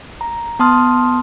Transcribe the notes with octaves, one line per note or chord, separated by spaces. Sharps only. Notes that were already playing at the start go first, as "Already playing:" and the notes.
A#5
B3 A5 C6 D#6 F6